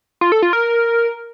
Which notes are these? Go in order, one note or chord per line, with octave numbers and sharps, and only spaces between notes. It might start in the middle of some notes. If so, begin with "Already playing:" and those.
F4
A4
F4
A#4